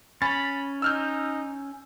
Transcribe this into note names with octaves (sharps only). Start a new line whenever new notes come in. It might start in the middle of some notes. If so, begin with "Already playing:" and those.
C#4 B5 A6
D#4 E6 F6 G6